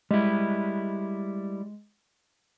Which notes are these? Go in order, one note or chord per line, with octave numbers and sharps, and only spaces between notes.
G3 G#3 E4